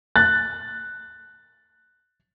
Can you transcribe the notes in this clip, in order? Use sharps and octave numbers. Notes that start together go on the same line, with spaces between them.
F#6 A6